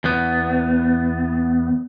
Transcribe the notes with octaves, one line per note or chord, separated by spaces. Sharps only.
E2 B3